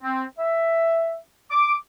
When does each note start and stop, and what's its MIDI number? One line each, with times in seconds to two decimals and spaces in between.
0.02 0.25 60
0.39 1.17 76
1.51 1.74 86